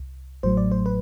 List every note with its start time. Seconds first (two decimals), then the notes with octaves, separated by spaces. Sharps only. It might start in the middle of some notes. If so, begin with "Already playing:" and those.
Already playing: C2
0.43 A1 A2 F#3 C5
0.57 D5
0.71 C5
0.86 B4